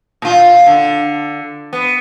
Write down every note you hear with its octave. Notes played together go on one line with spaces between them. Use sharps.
A#2 F4
D3
B3